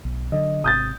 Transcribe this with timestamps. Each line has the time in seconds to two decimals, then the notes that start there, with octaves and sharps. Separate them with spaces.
0.05 B1
0.32 D3 F#3 D#5
0.64 G#1 C3 D#6 G6 A6